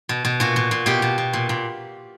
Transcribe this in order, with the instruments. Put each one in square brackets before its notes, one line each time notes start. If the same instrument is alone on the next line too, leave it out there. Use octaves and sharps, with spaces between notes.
[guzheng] B2
B2
A#2 F#4
A#2
A#2
B2 G4
B2
B2
A#2
A#2